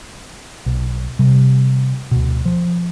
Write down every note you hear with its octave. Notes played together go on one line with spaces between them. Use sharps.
B1
C3 G3
D2 B2
F3